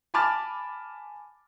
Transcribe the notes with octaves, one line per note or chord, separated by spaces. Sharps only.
G#5 A5 B5 D6 F6 A6